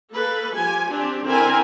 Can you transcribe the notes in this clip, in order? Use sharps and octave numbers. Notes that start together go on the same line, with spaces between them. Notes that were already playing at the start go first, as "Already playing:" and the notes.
A#3 A4 B4
F3 G4 G#5
C4 D4 G4
D3 C4 E4 A#4 G#5